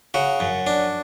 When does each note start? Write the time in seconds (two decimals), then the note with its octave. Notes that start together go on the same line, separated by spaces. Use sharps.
0.14 C#3 F#4
0.40 F#2
0.67 D4